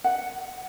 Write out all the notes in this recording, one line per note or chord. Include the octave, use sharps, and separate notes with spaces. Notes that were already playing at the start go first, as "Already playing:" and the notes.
F#5